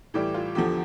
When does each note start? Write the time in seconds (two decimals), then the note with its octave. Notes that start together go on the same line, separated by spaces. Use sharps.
0.14 A2 E3 G3 G4
0.34 F4
0.55 E2 D3 F3 G4